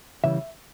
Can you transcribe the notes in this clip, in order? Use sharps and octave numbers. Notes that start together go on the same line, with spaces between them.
C#3 E3 G3 E5